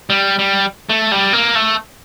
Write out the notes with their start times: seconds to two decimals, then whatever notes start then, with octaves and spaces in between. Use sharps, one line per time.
0.10 G3
0.39 G3
0.90 A3
1.12 G3
1.33 A#3
1.55 A3